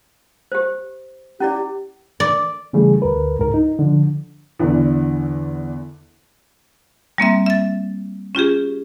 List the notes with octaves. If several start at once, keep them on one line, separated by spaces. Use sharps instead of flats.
G4 C5
C#4 E4 G4 D5
D5
C#3 E3 G3 A3 G#4
D2 A#4 B4
C#2 G#2 A#4
D#4
D3 F3
E2 D3 E3
G3 A#3 C4 E5
E5 A6
C#4 F4 G4 G#4